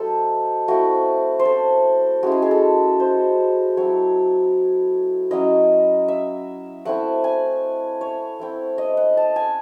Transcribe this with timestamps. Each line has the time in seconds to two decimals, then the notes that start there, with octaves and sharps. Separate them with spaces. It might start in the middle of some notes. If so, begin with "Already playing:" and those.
Already playing: F#3 A3 D#4 A4 C5
0.68 A3 C4 E4 F#4
1.40 C5
1.45 A4
2.23 G#3 C#4 E4 F#4
2.32 G#4
2.42 G#4
2.51 A4
3.00 C5
3.77 F#3 C4 E4 C#5
5.31 F#3 C#4 E4 D#5
6.08 E5
6.85 A3 C4 E4 F#5
7.24 G#5
8.01 C#5
8.40 A3 C4 E4
8.78 D#5
8.97 F#5
9.17 A5
9.36 G#5